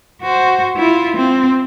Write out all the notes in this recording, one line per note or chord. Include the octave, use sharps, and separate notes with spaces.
F#4 C5
E4 F4
C4